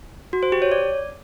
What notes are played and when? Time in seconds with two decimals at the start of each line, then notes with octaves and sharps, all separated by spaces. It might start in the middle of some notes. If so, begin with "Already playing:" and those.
0.33 F#4
0.43 C5
0.52 G4
0.62 C#5
0.72 D5